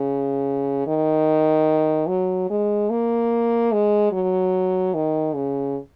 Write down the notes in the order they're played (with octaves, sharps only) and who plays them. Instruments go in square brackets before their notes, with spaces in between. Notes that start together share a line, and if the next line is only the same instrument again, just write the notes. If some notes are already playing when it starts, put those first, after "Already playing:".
Already playing: [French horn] C#3
D#3
F#3
G#3
A#3
G#3
F#3
D#3
C#3